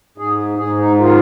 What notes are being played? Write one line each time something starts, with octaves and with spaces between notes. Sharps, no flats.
G#2 G#4
G#2 G#4
D#4
D#3 F4